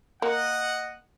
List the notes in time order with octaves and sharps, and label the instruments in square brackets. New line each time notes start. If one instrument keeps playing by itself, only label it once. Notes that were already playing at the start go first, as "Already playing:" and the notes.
[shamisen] A#3 [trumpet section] D#5 F#5